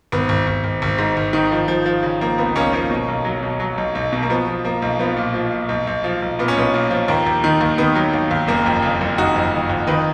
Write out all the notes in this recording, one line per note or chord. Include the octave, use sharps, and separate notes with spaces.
G#1 B3
G#1
G#1
G#1
G#1
G#2
G#1
D#3
F3
F3
F3
C#3
F3 A#3
C#2 B3
C#2 A#3 C#4
F3 A#3 C#4
B2
B1
F#3
B2
F#3
B1
B1
B2
A#3
F3 B3
F3
F3 A#3
B1
F3 B3
A#2
F3
A#2
B1
B1
F3
B1
A#2 B3
C#4
B1 B3
A#2
F3
D#2 A#3
D#2
D#3
D#2
D#3 B3
F#3
D#2
D#2
F#1 A#3
F2
C#3
F#1
F#1 D#4 F#4
F2
F#1
F2
D#3 B4 D#5